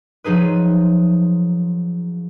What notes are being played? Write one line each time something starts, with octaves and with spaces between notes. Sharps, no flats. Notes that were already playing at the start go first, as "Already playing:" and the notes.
F3 F#3 D#4 G#4 B4